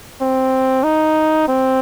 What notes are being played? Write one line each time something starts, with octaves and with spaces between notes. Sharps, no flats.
C4
D#4
C4